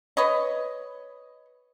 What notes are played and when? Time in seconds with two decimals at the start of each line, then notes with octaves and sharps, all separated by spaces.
0.17 B4 C#5 D#5